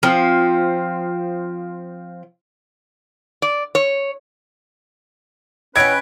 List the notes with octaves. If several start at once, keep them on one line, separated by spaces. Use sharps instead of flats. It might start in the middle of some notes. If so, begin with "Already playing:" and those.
F3 C4
D5
C#5
C#4 E4 B4 C#5 D#5 F#5 G5 G#6